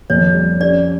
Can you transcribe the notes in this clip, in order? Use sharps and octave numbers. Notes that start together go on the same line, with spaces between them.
F2 C#5
G3
C#4 D5